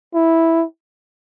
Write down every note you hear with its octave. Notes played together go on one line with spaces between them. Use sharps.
E4